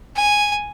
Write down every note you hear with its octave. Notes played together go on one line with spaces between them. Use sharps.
G#5